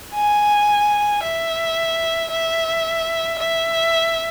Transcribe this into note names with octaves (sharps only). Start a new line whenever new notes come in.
G#5
E5
E5
E5